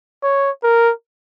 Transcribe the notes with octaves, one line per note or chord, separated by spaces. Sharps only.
C#5
A#4